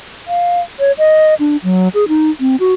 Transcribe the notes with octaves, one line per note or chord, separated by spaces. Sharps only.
F5
C#5
D#5
D4
F#3
G#4
D#4
C4
F#4